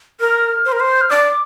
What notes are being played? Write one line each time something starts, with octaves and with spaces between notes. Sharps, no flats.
A#4 F6
C5
A#4
C5
G6
F6
D5 D6